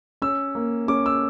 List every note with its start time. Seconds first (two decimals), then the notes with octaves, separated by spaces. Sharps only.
0.22 C#4 E6
0.55 A#3
0.88 C#4 D6
1.06 E6